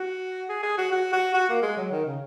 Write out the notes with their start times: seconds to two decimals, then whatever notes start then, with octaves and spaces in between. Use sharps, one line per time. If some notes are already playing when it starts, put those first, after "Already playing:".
Already playing: F#4
0.49 G#4
0.63 G#4
0.78 F#4
0.92 F#4
1.13 F#4
1.34 F#4
1.49 A#3
1.62 G#3
1.77 F#3
1.92 D#3
2.05 C#3